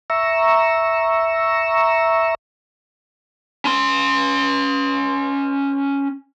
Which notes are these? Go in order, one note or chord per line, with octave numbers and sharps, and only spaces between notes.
E5 A#5 C#6 E6
C#4 C6